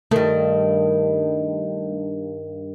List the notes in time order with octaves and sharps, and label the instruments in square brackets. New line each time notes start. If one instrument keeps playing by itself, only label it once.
[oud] G2 D#3 [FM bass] A3